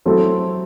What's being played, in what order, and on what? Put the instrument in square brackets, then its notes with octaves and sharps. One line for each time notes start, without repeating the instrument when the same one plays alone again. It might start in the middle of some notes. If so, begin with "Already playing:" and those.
[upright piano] F#3 A3 C4 E4 A4